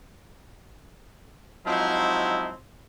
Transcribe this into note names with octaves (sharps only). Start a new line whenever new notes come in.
F3 F#3 G#3 C4 D#4 E4